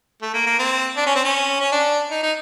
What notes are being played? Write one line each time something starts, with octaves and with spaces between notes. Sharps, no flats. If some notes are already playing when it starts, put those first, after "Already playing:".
A3
A#3
A#3
C4
D4
C#4
C4
C#4
C#4
D4
D#4
D#4